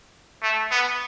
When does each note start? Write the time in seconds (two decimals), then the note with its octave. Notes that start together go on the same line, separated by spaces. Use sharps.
0.43 A3
0.71 B3